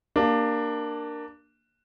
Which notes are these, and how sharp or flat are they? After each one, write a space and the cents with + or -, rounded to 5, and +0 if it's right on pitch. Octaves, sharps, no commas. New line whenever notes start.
A#3 +0 D4 +15 G4 +15